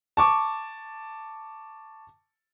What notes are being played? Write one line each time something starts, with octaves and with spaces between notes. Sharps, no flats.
A5 C#6 D6